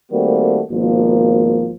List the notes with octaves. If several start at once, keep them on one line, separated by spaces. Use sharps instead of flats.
D#3 G3 A3 A#3 C4 F#4
G#1 B2 F3 A#3